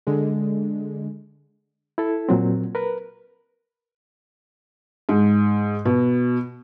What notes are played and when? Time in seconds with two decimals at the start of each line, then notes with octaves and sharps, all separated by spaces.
0.07 D3 G#3
1.98 E4 A4
2.29 A#2 F#3 C4
2.75 A#4 B4
5.09 G#2
5.85 B2